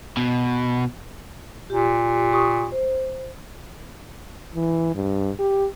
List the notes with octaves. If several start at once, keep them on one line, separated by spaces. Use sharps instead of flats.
B2
A#2 G4
G4 C#6 D#6
C5
E3
G2
G4